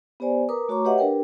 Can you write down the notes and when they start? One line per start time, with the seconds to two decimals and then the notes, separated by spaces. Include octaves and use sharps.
0.20 B3 G4 B4 C5 D5 G#5
0.49 A#4 B4 A#5 D6 D#6
0.68 A3 F#4 C#5 A#5 C#6 D6
0.85 G4 B4 C#5 D#5 E5 F#5
0.98 D4 G4 A#4 B4 G5